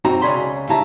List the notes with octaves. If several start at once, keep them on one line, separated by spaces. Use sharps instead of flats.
F#2 C4 D#4 F#4 A#5
C#2 C#4 G#4 D5 B5 C6
G2 C#3 E4 E5 A5 A#5